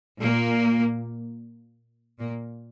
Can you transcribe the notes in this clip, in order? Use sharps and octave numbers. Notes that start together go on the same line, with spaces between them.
A#2 A#3
A#2 A#3